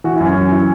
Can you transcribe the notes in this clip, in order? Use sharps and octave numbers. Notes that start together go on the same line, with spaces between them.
E3 F#4
E4
F#2
C#4
F#2
E3